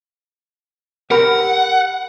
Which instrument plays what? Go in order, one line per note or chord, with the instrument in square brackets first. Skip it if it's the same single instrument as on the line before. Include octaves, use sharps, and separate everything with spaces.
[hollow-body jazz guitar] G4 A#4 B5 [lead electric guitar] F#5